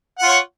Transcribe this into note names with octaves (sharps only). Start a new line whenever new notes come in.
F4 C#5 F#5